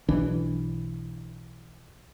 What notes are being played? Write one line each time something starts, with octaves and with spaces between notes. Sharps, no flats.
B1 E3 D4